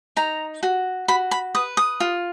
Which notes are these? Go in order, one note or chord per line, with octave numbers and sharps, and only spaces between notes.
D#4 A#5
F#4
F#4 B5
B5
B4 D#6
D#6
F4